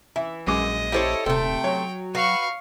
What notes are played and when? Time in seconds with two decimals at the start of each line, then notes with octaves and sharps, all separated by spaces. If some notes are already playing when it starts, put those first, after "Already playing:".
0.16 E3 E5
0.47 A#1 F#2 G#3 D#5 D6
0.92 E4 G4 A4 C5 C#5
1.26 D#1 C3 A3 A4 G5
1.64 F#3 C#5
2.15 F#4 B4 F5 C#6